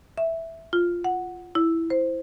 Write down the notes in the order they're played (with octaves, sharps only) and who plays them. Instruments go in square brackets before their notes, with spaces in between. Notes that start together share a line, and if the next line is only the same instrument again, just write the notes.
[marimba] E5
F4
F#5
E4
C5